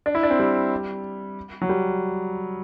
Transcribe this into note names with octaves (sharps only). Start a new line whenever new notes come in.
D4
E4
D4
C4
G3
F#3
G3